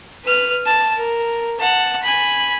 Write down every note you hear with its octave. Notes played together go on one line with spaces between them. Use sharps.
B4 F6
A5
A#4
F#5 A5
G#5 B5